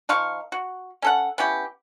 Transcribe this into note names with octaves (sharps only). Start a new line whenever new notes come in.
D#3 F3 F5 C#6
F#4
C#4 A4 F#5
B3 C#4 E4 G4